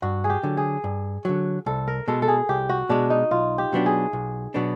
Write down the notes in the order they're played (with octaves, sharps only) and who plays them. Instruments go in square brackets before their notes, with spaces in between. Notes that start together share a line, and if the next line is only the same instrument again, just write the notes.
[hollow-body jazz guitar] G2 [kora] F#4
[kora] G#4
G4
[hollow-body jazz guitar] D3 F#3
[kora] G#4
[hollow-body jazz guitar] G2
D3 F#3
[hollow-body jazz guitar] C2 [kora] A4
[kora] A#4
[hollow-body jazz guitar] B2 G#3 [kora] A4
[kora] A4
G#4
[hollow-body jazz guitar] C2 [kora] G4
[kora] F#4
[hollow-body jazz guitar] B2 G#3 [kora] D4
[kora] D#4
[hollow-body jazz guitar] B1 [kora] F4
[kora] G4
[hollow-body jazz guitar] B2 F#3 B3 D4
[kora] G#4
[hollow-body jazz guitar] B1
B2 F#3 B3 D4